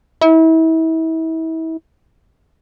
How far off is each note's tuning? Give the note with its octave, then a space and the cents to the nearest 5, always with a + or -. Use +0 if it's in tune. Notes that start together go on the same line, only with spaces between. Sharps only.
E4 -35